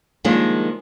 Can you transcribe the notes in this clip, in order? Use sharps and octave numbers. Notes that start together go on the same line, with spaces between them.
D#3 F3 G3 G#3 A#3 D4